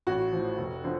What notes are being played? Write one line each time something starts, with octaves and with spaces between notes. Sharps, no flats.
A1 F#4
A2 F3
F1
D3 F3